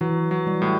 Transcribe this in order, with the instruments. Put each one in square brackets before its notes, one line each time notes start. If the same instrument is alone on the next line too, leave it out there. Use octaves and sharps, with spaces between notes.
[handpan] E3 [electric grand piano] F#3
[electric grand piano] F#3
[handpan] G3
[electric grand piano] A2